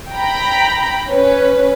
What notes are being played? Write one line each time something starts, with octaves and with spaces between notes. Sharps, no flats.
G5 A#5 B5
C#4 B4